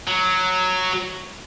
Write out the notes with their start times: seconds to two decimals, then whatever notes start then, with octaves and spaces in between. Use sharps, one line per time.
0.08 F#3